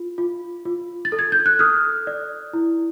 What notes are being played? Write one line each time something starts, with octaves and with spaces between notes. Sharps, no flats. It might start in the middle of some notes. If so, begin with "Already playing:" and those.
Already playing: F4
F4
F4
A6
A4
G#6
G6
F#6
A4 D#6 F6
D5
E4